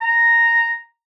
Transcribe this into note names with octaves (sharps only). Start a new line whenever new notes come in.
A#5